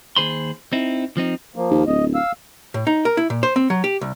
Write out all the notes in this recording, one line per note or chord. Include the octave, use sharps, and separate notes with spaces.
D#2 G#2 G#4 C5 B5 C6
C4 D#4 E4
F3 C4 D#4
F3 A#3
D#2
D1 D#5
F5 E6
A2
D#4
A#4
E4
A#2
C5
C4
F#3
G4
C2